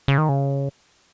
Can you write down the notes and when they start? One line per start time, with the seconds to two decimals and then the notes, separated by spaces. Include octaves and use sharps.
0.08 C#3
0.18 D#3
0.29 C#3